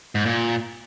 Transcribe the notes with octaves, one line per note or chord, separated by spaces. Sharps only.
G#2
A#2